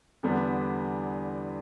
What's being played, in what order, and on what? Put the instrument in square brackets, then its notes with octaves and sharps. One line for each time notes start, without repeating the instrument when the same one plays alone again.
[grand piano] E2 D3 G3 B3 D4